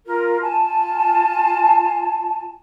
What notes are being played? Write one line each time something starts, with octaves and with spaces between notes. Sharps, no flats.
F4 A#4
F4 G#5 A5